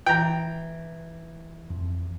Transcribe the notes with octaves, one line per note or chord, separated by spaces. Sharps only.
E3 G5 A#5
F2